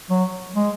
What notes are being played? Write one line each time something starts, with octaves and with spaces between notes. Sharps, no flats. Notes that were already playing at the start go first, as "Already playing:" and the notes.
F#3
G#3